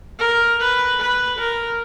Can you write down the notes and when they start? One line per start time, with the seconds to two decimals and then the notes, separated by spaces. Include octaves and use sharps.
0.19 A#4
0.60 B4
1.00 B4
1.39 A#4